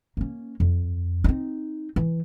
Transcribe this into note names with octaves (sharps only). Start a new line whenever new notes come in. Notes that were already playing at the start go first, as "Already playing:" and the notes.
A#3 C#4
F2
C4 D#4
E3